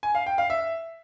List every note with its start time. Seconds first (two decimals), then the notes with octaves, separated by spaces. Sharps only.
0.03 G#5
0.15 F5
0.26 G5
0.38 F5
0.50 E5